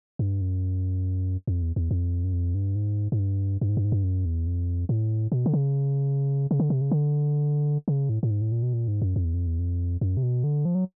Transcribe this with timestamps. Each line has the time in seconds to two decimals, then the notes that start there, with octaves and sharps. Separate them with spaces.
0.19 G2
0.41 F#2
1.48 F2
1.62 E2
1.76 E2
1.91 F2
2.24 F#2
2.33 F2
2.55 G2
2.75 G#2
3.12 G#2
3.19 G2
3.61 G2
3.69 G#2
3.77 G2
3.84 G#2
3.92 G2
4.04 F#2
4.25 E2
4.47 F2
4.89 A2
5.32 B2
5.46 D3
5.54 C#3
6.51 C#3
6.60 D3
6.70 C3
6.81 C#3
6.91 D3
7.88 C#3
8.09 A2
8.23 A2
8.31 G#2
8.41 A2
8.52 A#2
8.63 B2
8.73 A#2
8.88 G#2
9.02 F#2
9.16 F2
9.25 E2
9.34 F2
9.47 E2
9.59 F2
10.01 F#2
10.17 C3
10.23 B2
10.44 D3
10.65 F3
10.75 F#3